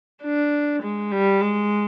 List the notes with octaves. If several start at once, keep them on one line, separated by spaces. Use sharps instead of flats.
D4
G#3
G3
G#3